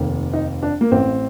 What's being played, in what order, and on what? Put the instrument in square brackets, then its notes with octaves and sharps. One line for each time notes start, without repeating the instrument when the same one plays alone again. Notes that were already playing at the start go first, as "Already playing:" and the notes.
Already playing: [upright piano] F1 D#2 D#3
D#4
D4
A#3
A1 A2 C4